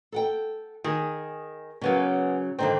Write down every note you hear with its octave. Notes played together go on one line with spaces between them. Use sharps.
A4 F#5 G5
D#3 G#4
C#3 F#3 A#3 B3 C#4
F2 G#2 D3 D#3 C4